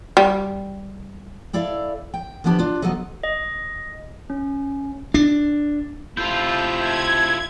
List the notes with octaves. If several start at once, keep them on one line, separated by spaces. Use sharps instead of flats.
G3
E4 A4 D5 E5 F5
G5
D3 F3 B3 D4 G4 A5
D4 F4
F3 F#3 B3 A4 D#5
D#5
C#4
D4
C3 A3 E4 F4 A4 G6
G#6